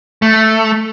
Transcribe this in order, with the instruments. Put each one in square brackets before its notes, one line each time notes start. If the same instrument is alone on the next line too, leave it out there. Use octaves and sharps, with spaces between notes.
[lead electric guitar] A3